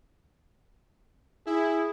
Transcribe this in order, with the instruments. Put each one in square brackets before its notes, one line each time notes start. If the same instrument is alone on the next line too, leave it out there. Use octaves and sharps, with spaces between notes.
[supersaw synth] E4 [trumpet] G#4